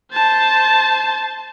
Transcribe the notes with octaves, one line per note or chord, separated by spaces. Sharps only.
C5 A5